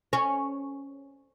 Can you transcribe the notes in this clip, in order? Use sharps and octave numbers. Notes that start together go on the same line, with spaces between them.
C#4